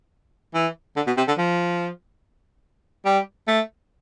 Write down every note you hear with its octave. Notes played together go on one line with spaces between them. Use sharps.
E3
D3
B2
C3
D3
F3
G3
A3